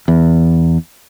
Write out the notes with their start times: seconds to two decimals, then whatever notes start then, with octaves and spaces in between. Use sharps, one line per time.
0.08 E2